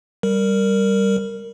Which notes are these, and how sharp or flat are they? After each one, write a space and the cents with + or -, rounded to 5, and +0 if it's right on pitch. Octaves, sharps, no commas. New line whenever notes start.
G3 +0 A#4 -10